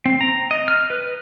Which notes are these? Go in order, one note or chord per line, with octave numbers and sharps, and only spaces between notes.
C4
A#5
D#5
F6
B4